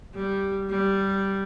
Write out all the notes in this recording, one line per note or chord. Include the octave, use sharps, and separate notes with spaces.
G3
G3